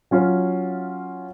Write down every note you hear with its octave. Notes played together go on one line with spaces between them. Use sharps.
F#3 C#4 F4